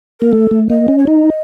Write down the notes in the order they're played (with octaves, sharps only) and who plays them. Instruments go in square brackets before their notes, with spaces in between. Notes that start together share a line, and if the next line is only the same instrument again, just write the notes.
[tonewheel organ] A#3 [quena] A#4
[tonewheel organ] A3 [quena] A4
[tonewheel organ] A3
[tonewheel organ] A#3 [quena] D#5
[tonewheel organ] C#4
[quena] C#5
[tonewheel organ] D#4 [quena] D#5